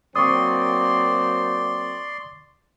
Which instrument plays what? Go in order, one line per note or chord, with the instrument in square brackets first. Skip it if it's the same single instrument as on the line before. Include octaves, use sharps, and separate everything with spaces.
[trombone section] F#3 A#3 C4 [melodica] D5 C6 [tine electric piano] C#6 D#6